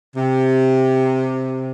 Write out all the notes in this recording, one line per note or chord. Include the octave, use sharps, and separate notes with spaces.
C3